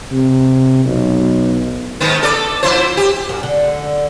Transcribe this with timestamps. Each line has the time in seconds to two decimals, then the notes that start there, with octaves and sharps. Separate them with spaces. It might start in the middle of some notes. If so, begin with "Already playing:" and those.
0.11 C3
0.85 B1
2.00 G#2 D#3 B3
2.23 A4 D5
2.63 F3 E4 C5
2.97 G4
3.29 F#2
3.43 D3